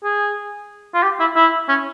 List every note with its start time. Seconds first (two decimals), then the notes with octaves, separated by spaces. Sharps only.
0.04 G#4
0.94 F4
1.03 G4
1.20 E4
1.36 E4
1.69 C#4